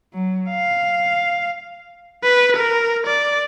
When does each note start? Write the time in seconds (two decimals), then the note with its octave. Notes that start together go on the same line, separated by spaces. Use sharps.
0.13 F#3
0.50 F5
2.23 B4
2.56 A#4
3.06 D5